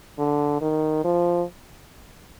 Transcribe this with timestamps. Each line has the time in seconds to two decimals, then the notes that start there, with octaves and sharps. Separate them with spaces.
0.18 D3
0.61 D#3
1.04 F3